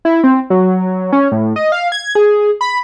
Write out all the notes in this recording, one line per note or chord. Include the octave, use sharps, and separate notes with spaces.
E4
C4
F#3
C#4
A2
D#5
F5
G#6
G#4
B5